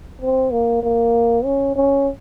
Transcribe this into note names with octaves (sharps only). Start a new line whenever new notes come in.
C4
A#3
A#3
C#4
C#4